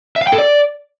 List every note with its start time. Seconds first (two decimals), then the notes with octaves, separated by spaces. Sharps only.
0.16 E5
0.22 F5
0.27 G5
0.33 A4
0.38 D5